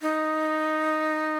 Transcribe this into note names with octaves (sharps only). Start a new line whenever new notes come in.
D#4